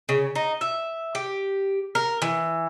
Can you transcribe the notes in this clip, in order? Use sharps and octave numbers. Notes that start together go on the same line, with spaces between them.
C#3
D#4
E5
G4
A#4
E3